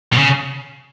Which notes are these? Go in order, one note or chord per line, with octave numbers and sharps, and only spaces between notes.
B2
C#3